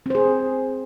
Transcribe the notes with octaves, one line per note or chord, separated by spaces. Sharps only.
C4 G#4 C5